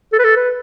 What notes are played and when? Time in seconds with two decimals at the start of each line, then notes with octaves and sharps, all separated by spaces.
0.13 A4
0.19 B4
0.24 A4
0.37 B4